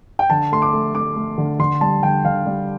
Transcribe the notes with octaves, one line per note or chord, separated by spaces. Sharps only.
G5
D3 A5
A3 C6
D6
A3
A3 D6
A3
D3
D3 C6
G3 A5
D3 G5
D3 F5
G3